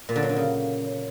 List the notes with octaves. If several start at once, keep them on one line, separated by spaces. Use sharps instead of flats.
A#2
D3
F#3
D3
C#3